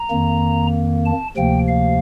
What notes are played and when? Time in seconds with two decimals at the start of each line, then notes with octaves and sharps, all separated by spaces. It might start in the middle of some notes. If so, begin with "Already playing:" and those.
Already playing: A#5
0.10 F2 D#3 A#3
1.06 A5
1.37 D2 C3 F3 A#3 G5
1.68 F5